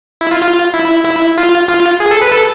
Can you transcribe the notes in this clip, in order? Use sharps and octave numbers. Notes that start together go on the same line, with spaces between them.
E4
F4
F4
E4
E4
F4
F4
G#4
A4
B4
A4